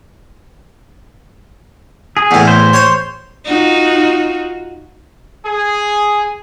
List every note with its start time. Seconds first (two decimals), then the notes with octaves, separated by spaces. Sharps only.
2.17 G#4
2.31 E2 A2
2.48 C5
2.73 C#5 C6
3.44 D#4 F4 F#4
5.45 G#4